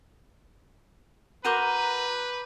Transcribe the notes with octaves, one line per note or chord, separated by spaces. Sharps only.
F#4 A#4 B4 A#5 C6 D6 G6 D#7